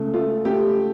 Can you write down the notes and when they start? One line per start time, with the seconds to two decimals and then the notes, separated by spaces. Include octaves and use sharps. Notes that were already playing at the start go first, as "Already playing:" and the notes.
Already playing: C#2 C#3 A3
0.14 A3 F4
0.45 A3 G4